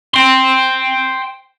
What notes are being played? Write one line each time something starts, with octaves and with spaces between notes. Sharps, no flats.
G5 C6